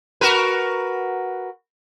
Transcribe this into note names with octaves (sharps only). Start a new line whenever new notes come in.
F#4 A#4 B4